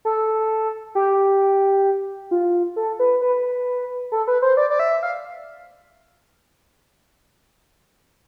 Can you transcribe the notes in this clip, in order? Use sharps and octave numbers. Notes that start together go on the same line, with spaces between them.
A4
G4
F4
A4
B4
B4
A4
B4
C5
D5
D5
E5
F5